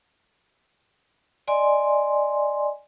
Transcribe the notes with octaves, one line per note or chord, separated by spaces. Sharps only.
D5 D#5 G#5 C6